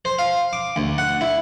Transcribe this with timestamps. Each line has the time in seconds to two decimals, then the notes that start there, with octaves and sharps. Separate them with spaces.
0.05 C5
0.19 F5
0.53 D6
0.76 D2
0.98 F#5
1.21 E4